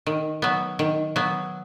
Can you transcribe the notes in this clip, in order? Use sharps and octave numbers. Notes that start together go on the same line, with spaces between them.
D#3
F#3 B3
D#3
F#3 B3